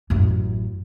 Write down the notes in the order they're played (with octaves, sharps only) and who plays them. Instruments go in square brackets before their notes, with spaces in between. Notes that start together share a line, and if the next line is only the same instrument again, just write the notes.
[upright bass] A1 F#2